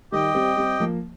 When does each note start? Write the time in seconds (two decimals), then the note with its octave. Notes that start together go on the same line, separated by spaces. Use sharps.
0.12 D#3 G3 G4 D#5 G5
0.35 G3 C4
0.57 G3 C4
0.80 F3 A#3